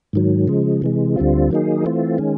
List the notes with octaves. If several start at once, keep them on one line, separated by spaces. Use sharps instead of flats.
G#2 D#3 F#3
C#3 F3 G#3
C3 E3 G#3
D2 D3 G3 C4 F4
D#3 F#3 A#3 D#4 G#4
E3 A3 C4 F4
D#3 G#3 C#4